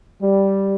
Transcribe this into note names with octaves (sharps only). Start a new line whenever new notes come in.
G3